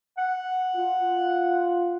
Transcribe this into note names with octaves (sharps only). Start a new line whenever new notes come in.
F#5
F4